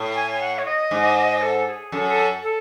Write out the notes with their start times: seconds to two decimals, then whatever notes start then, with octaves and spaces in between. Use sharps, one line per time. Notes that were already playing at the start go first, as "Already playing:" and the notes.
Already playing: A2
0.15 G#5
0.31 G#5
0.41 F#5
0.59 C#5
0.65 D#5
0.91 G#2
1.42 A4
1.67 G#4
1.92 F#2 A4
2.09 A4
2.43 A4